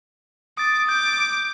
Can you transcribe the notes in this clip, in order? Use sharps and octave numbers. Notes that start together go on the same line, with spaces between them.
D6 D#6 A6
D6 G6